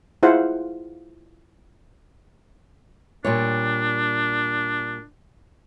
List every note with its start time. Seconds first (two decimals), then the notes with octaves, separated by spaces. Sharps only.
0.23 E4 F4 G#4 C5 F5 F#5
3.25 A#2 G3 D4 C#5